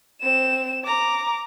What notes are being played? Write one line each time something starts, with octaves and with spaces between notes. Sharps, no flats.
C4 E7
A#5 D6